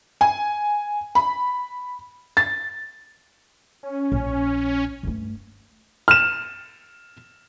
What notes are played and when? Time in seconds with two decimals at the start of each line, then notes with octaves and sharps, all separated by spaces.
0.21 G#5
1.15 B5
2.37 A6
3.83 C#4
4.12 A#1
5.03 G2 A3
6.08 F6 E7